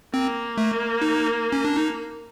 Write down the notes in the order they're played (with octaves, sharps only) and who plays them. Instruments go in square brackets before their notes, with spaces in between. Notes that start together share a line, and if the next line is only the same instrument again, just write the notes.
[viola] A#3 [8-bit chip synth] C4
[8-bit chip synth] A3
D#4
C#4
D4
D#4